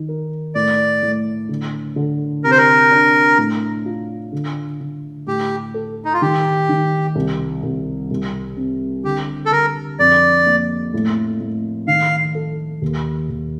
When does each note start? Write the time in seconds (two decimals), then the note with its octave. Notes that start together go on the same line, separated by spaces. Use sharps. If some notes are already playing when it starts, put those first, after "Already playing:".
Already playing: D#3
0.08 A#4
0.55 A2 D5
1.03 A2
1.49 D3
1.96 D3
2.44 C3 A#4
2.51 C5
2.57 A#4
2.91 D4
3.38 A2
3.86 F4
4.33 D3
4.80 D3
5.27 A2 G4
5.74 A4
6.05 D#4
6.13 F4
6.22 D#3 G4
6.69 D#3
7.15 C2
7.63 C2
8.10 C2
8.57 C4
9.04 D3 G4
9.46 A4
9.51 D3 A#4
9.99 F2 D5
10.46 A#3
10.94 A2
11.40 A2
11.87 D#3 F5
12.35 A4
12.82 D#2
13.29 D#2